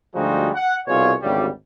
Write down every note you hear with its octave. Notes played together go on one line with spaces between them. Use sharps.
D2 F3 G3 G#3 D#4 F#4
F#5
C2 B2 F4 G#4 C#5
G#1 D2 C#3 G3